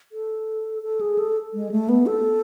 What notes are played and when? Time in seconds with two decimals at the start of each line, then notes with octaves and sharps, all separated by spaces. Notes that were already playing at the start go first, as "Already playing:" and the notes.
0.12 A4
0.83 A4
1.01 G#4
1.18 A4
1.54 G#3
1.71 A3
1.89 B3
2.06 A4